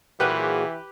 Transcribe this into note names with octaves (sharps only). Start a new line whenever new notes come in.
A#2 E3 F#3 G4 G#4 B4 F#6